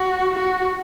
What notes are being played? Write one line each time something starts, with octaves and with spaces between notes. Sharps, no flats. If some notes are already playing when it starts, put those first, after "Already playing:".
Already playing: F#4
F#4